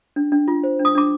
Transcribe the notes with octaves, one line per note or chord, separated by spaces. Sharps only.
D4
D4
F4
C5
D4
D#6
D4 D6